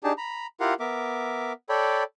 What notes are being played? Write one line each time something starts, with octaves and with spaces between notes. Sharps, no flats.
D4 D#4 G4 G#4 A5
A#5 B5
E4 F4 G4 A#4 F5 F#5
B3 A#4 E5 D6
A4 C#5 D5 G5 B5